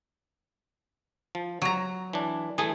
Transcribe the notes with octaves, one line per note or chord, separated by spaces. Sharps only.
F3
F#3 C#5 A#5
E3 D4
E3 A3 G#4